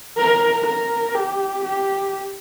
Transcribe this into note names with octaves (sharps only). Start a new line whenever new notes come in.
A#4
A#4
G4
G4